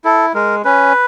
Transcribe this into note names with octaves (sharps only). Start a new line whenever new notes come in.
E4 A4
G#3 A#4
C#4 B4